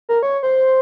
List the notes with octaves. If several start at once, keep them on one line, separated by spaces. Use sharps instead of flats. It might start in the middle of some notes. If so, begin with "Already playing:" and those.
A#4
C#5
C5